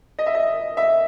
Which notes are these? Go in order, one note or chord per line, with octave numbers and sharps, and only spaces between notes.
D#5
E5
D#5
E5